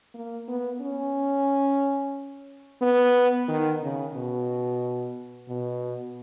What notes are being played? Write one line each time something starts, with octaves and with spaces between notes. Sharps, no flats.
A#3
B3
C#4
B3
D#3
C#3
B2
B2